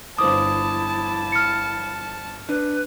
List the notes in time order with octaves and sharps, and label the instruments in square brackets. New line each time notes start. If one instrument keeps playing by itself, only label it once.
[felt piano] G1 C5 D6 [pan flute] E4 [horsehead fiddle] A5 [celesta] D#6
[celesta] F6 C#7
[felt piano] D4 [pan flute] B4